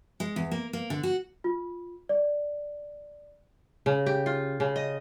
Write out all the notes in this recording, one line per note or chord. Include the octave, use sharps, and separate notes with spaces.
G#3
E2
A#3
A#3
D3
F#4
F4
D5
C#3
G4
F4
C#3
D#5